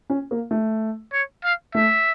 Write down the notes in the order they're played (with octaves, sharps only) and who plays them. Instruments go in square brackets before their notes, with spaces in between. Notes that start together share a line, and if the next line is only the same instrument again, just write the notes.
[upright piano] C#4
A#3
A3
[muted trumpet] C#5
F5
[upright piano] A3 [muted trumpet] E5